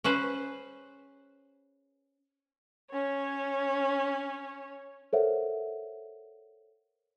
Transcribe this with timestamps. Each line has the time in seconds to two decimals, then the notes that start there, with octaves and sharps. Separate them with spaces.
0.04 C#4 G#4 B4 C5
2.91 C#4 C#5
5.13 A4 A#4 C5 C#5 E5 F#5